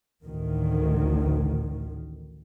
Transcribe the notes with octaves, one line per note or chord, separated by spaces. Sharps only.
A1 D2 A2 D#3